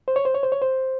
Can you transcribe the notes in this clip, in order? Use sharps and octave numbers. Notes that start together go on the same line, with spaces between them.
C5
C#5
C5
C#5
C5
C#5
C5